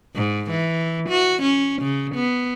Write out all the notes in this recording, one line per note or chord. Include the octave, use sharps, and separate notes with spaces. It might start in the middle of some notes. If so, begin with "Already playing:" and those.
G#2
E3
F#4
C#4
C#3
B3